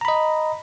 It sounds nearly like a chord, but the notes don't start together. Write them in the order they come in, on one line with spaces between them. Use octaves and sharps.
A#5 B5 D#5